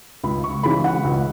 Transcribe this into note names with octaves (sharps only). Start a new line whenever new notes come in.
C#2 B5
C#6
C#3 E3 G#3 B5
F#5
C#2